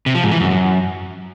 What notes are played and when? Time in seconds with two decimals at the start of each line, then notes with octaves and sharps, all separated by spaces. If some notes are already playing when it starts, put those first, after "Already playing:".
0.06 C3
0.15 F3
0.23 G#2
0.31 E3
0.40 F#2